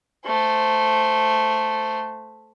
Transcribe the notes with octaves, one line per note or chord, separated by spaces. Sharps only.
A3 C5